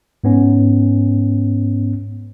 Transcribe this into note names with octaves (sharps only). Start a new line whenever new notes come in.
G#2 B3 C#4